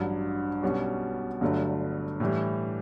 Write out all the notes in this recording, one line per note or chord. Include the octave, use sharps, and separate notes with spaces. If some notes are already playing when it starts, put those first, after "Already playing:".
Already playing: A1 G2 F#3
B1 B2 G3 C#4
G1 G2 D3 F#3 A3
A2 E3 G3